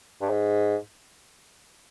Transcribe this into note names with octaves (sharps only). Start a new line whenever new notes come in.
G2
G#2